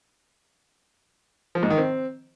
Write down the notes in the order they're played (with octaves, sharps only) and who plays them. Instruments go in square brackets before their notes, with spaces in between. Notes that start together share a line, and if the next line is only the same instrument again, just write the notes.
[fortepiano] F3
G#2
D#3
C4